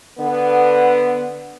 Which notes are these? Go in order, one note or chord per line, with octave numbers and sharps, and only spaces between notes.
D3 B3